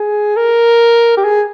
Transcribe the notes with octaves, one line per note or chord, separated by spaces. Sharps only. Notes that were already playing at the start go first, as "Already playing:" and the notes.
Already playing: G#4
A#4
G4
G#4